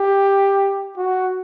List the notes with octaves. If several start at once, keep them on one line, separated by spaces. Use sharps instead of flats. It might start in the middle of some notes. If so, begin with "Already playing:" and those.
Already playing: G4
F#4